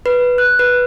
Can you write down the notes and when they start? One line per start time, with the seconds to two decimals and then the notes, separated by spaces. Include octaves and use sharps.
0.06 B4
0.38 F#6
0.59 B4